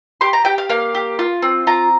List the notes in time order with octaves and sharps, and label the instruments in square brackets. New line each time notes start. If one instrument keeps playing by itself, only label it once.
[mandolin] G4 C6
A#5
G4 G5
F5
A#3 F5
G4
F4
C4
F4 A#5